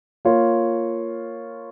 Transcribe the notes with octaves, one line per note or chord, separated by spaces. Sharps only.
A#3 F4 C#5